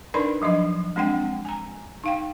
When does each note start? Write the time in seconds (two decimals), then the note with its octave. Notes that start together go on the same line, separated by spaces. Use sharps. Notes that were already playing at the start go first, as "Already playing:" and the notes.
0.14 D4 D#4 A#4 B4 D5 B5
0.42 F3 F#3 D4 D#5
0.96 G#3 C4 D4 F#5 G5
1.45 G#5 A#5
2.04 D#4 F5 G5